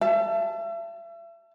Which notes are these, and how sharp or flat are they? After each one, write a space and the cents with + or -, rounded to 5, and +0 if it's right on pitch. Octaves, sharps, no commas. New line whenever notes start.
E5 +35 A5 +0